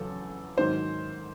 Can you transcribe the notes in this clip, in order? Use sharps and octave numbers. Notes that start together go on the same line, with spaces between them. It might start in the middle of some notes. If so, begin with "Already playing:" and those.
Already playing: E2 C#3 F#3 A4
G#2 D#3 F#3 C5